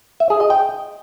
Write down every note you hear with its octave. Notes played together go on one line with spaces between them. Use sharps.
E5
G#4
D#5
G5